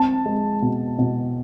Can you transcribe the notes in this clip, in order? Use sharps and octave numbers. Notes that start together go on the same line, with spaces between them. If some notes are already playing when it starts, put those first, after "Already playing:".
Already playing: C4 A5
G#3
B2
B2